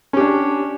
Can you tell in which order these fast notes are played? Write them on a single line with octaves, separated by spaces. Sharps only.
C#4 G4 D4